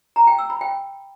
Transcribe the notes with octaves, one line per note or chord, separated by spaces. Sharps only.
A#5
G5
E6
B5
G5